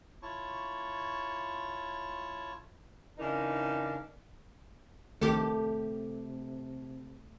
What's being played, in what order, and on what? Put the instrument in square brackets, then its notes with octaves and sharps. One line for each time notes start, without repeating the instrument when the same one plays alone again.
[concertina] E4 F4 C#5 A5 C#6
[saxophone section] C#3 E3 D4 D#4 A#4
[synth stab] A#1 D#3 G4 [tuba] C3 [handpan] A3 [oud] A4